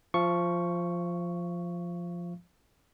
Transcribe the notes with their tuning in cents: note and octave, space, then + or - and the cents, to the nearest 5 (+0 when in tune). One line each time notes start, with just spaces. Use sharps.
F3 +0 F5 -35 C#6 +0